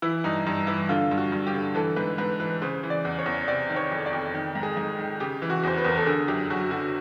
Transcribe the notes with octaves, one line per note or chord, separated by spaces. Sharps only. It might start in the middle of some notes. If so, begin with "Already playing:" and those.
E3 E4
G2 D#4
G2 D#4
E3 E4
D3 F4
G2
F#4
G2
G4
D3
E3 A4
G#2 B4
G#2 B4
E3 B4
C#3 C5
E3
D5
E2
C#5
E2
C3 D5
D#3
C#5
F2
D5
F2
D#3
G#2
G#4
G#2
D#3
C#3 G4
E3
F#4
E2 C5
B4
E2 A#4
A4
D3 G#4
F#2 G4
F#2 F#4
D3 F#4